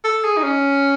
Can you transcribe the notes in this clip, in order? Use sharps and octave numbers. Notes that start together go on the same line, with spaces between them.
A4
G#4
D#4
C#4